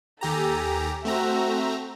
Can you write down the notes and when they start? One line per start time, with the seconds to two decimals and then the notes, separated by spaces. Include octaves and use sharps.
0.21 D#2 G4 A4 G#5 A#5
1.05 A3 C4 F#4 E5 A#5